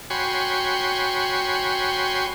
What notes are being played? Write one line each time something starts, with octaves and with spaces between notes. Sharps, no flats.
F#4 C#5 G5 G#5 B5 C6